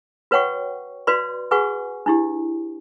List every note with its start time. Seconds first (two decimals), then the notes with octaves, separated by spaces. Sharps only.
0.31 F#4 B4 C#5 F#5 G5 C#6
1.07 F#4 B4 D5 C6
1.51 F#4 G#4 B4 F#5 G#5 C#6
2.06 D4 E4 G4